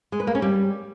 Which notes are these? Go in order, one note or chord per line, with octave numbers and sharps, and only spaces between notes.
G#3
B4
A#3
C#4
G3